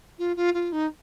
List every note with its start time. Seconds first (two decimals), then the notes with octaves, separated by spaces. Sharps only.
0.18 F4
0.36 F4
0.54 F4
0.72 D#4